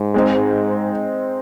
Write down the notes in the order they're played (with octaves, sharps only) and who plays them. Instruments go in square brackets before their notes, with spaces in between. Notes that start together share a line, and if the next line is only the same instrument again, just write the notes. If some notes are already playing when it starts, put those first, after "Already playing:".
Already playing: [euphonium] G#2
[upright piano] G#3 C4 D#4